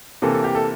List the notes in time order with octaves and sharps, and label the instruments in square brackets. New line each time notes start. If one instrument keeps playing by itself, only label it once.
[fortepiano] C3 E3 A#3 [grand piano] A4
[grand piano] A4
G4
A4